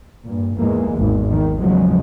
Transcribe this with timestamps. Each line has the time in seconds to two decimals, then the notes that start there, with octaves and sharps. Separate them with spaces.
0.25 G2 A#2
0.57 E2 G#2 E3 G#3 A#3
0.94 G#1 E2
1.30 D#3
1.59 E2 C#3 F3 F#3 G#3